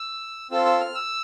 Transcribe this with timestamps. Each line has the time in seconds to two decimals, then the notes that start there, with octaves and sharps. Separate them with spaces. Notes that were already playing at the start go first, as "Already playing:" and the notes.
Already playing: E6
0.51 C4 F4 A4 E6
0.66 E6
0.81 F6
0.95 E6